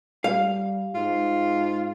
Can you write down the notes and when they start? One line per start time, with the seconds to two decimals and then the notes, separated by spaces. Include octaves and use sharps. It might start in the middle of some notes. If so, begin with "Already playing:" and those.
0.24 G3 F5
0.95 G#2 F4